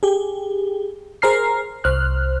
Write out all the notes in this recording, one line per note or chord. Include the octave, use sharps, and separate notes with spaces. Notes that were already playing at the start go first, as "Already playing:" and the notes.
G4 G#4
G#4 A#4 C5 A#5 F6 C7
C2 C5 F6 F#6